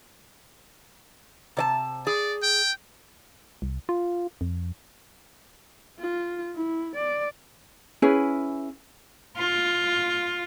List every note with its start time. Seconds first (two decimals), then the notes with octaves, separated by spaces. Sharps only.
1.57 C3 D5 A5
2.07 G#4 D5
2.43 G5
3.62 C2
3.89 F4
4.41 F2
6.00 F4
6.56 E4
6.96 D5
8.02 C#4 E4 G#4 B4
9.37 F4